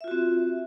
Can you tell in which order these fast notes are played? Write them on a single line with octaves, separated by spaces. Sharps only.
E5 F4 F#4 C4